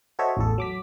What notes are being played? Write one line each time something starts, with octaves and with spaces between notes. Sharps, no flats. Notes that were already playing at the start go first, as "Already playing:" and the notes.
F#4 A4 C5 C#5 D#5 E5
A1 E2 A4
F#3 D6 B6